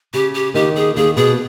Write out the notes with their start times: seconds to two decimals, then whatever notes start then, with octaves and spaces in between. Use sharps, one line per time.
0.13 C#3 G4
0.34 G4
0.54 D#2 D#3 G4
0.76 G#4
0.96 D#2 D#3 G#4
1.16 B2 G#4